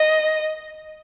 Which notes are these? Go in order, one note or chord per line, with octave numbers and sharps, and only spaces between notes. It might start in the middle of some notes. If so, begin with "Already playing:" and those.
Already playing: D#5